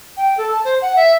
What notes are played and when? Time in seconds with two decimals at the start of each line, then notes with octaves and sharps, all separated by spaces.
0.17 G5
0.37 A4
0.51 A5
0.64 C5
0.82 F#5
0.96 E5